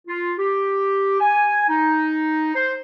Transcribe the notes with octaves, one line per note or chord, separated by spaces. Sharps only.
F4
G4
G#5
D#4
C5